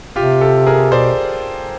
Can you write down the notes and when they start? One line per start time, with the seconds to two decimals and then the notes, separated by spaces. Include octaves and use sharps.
0.15 C3 F4 G4
0.41 G4 A4
0.67 G#4 A#4
0.92 B2 C5 D5